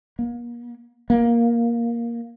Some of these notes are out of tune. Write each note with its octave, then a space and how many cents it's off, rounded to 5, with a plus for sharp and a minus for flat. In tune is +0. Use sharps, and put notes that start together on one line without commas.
A#3 +40
A#3 +10